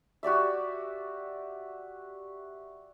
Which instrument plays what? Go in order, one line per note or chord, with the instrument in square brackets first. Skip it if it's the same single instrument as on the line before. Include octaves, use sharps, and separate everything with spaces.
[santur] F#4 G4 D5 E5